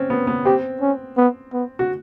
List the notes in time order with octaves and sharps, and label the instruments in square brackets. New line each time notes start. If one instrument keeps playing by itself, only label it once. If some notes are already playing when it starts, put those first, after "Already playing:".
Already playing: [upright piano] C4 C#4
B3
B3
[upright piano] C4 [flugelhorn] G4
[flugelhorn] C#4
B3
B3
[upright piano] F#4